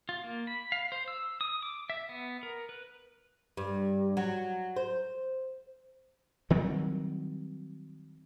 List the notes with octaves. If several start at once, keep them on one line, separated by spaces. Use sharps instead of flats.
F4
A#3
B5
F5
C5
E6
D#6
D6
E5
B3
A#4
B4
G2
F#3
C5
D#3 F#3 G3 C4